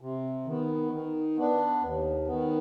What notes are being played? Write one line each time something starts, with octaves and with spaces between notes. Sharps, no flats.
C3
D#3 B3
D#3
B3 D4
D#2
D#3 B3